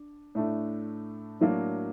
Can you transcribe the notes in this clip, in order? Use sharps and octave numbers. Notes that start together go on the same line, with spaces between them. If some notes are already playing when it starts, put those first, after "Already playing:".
Already playing: D4
A2 A3 D4
A2 F#3 A#3 D4